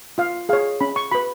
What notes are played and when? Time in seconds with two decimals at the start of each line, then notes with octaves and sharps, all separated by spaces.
0.18 F4 F5
0.49 G#4 C#5 F5
0.81 C#4 B5
0.96 C#6
1.12 F#4 B4 B5